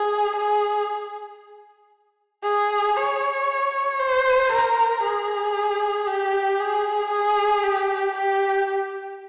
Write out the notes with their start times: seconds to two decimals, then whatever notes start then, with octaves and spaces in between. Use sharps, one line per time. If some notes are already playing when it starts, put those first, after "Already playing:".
Already playing: G#4
0.36 G#4
2.44 G#4
2.96 C#5
3.99 C5
4.52 A#4
5.03 G#4
6.07 G4
6.59 G#4
7.10 G#4
7.63 G4
8.15 G4